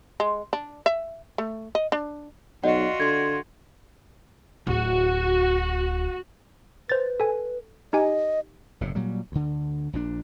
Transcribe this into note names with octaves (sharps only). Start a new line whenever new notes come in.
G#3
D4
E5
A3
D#5
D4
B1 F4 F#4 D5 D#5 F#5
D3 C6 G#6
D1 F#4
B4 C5 A6
A4 G#5
D#4 G4 D#5 G#5
F#1 A2 C3
A#2 F#3 G3
D2 D3
A#1 A#2 D4